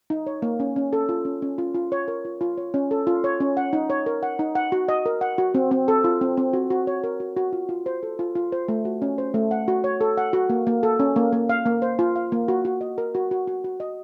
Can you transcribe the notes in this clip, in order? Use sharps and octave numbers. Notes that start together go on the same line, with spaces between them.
D#4
C#5
A#3
C#4
C#4
A4
F4
C#4
C#4
F4
F4
C#5
A#4
F4
F4
C#5
C#4
A4
F4
C#5
C#4
F#5
D#4
C#5
A#4
F#5
D#4
F#5
F#4
D#5
A#4
F#5
F#4
C4
C4
A4
F4
C4
C4
F#4
F#4
C#5
A#4
F#4
F#4
F4
F4
C5
A4
F4
F4
C5
A3
F#4
C#4
C5
A3
F#5
F#4
C#5
A4
F#5
F#4
A#3
A#3
A4
C#4
A#3
A#3
F5
A#3
C5
F4
F5
A#3
F#4
F#4
D#5
A#4
F#4
F#4
F#4
F#4
D#5